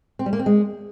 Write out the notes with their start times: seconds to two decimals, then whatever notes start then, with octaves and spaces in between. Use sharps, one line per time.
0.19 C4
0.26 G3
0.33 A#3
0.39 C4
0.46 G#3